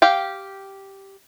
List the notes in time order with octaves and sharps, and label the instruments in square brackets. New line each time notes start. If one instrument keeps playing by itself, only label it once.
[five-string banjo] G4 F5 G5